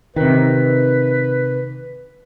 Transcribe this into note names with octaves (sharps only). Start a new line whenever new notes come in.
C3 D#3 B4